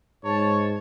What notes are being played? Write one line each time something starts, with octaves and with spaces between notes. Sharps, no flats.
G#2 C#5 A5